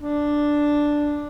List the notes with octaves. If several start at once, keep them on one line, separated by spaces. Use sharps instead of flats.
D4